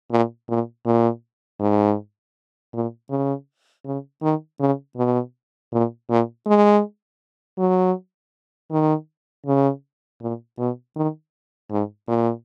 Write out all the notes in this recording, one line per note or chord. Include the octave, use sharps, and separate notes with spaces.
A#2
A#2
A#2
G#2
A#2
C#3
C#3
D#3
C#3
B2
A#2
A#2
G#3
F#3
D#3
C#3
A#2
B2
D#3
G#2
A#2